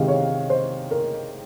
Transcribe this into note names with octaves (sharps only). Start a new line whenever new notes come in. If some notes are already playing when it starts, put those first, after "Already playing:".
Already playing: C3 D#3 G#3 F5
C#5
C5
A#4